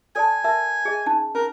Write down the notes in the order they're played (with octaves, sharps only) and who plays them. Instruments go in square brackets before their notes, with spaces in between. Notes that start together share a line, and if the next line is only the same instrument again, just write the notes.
[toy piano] A4 D5 A5 [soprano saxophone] G#5
[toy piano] A#4 E5 A5
G#4 D#5
C#4 D#4 A5
[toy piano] C#4 [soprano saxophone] A#4